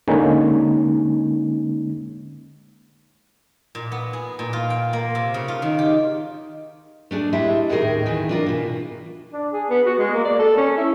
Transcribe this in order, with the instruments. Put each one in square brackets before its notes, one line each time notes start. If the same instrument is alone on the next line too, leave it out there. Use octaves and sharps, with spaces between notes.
[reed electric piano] D3 G#3 A#3 C#4 D#4
[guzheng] A#2
B3
G#4
A#2
F4
G5
A#3
C3
C#3
F4
D#3
G4
[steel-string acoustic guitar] A3 D4 G#4
G#3 A3 E4 G4 E5
D#2 A2 D#3 C#4 G#4 A#4
D#3 E3
D4 F4 A#4
B2 E3
[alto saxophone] D4
G#4
B3
F#4
G#3
A#3
D5
A4
C#4
E4